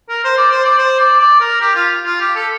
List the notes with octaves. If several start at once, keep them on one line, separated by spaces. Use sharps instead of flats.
A#4
C5
D5
C5
D5
C5
D5
D5
A#4
G4
F4
F4
G4
A4